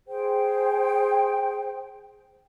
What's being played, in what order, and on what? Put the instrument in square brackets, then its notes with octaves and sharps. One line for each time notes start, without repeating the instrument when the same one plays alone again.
[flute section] G#4 C5 G5